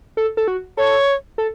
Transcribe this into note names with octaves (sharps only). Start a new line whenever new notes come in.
A4
A4
F#4
A4 C#5
A4